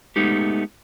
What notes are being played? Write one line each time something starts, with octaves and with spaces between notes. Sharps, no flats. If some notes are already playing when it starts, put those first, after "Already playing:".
G#3 A3 B3 D#4 G4